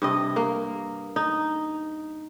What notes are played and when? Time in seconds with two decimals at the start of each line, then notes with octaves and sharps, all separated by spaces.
0.02 G2 C3 D#5
0.36 A#3
1.16 D#4